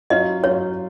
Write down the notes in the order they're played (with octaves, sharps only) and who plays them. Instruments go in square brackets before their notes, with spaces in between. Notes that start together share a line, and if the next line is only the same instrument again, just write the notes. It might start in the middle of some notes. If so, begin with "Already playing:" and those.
[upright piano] F#3 C#4 F4 [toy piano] D#5
[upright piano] F#3 C#4 F4 [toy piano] C#5